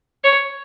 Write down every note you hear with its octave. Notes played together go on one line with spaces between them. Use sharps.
C#5